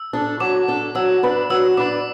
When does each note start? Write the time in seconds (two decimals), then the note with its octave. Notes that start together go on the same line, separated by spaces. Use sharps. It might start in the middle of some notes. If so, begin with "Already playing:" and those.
Already playing: E6
0.13 D4 A4
0.40 F#3 D6
0.68 D4 A4
0.95 F#3 E6
1.23 D4 B4 D5
1.50 F#3 E6
1.77 D4 B4 D5 D6